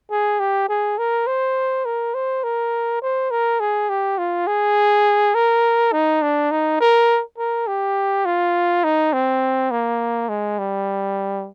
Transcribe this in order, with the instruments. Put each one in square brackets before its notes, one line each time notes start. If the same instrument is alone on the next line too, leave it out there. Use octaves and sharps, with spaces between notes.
[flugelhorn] G#4
G4
G#4
A#4
C5
A#4
C5
A#4
C5
A#4
G#4
G4
F4
G#4
A#4
D#4
D4
D#4
A#4
A#4
G4
F4
D#4
C4
A#3
G#3
G3